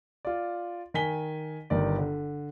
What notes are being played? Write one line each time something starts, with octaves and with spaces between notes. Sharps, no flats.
F4 D5
D#3 G#5 B6 G7
G1 D#3 D5
D3